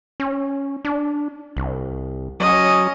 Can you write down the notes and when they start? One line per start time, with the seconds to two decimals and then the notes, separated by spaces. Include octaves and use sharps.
0.20 C#4
0.85 D4
1.57 C2
2.40 F#3 C#4 D#5